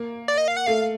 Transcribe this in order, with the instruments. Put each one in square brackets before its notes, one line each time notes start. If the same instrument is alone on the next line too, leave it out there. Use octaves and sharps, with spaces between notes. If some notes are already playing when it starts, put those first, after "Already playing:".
Already playing: [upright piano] A#3
[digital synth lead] D5
D#5
F5
F#5
[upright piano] A3 [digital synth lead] F5